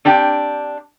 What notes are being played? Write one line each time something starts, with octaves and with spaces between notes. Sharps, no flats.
C4 D4 G4 G5